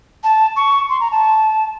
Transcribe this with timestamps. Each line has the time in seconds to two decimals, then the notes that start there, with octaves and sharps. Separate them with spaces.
0.24 A5
0.56 C#6
0.90 C6
1.00 A#5
1.12 A5